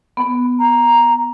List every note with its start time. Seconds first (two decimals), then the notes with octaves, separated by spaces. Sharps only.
0.17 B3
0.59 A#5